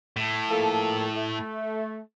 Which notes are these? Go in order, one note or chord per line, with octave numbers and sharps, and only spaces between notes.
A2
F3 A#3 A4
A3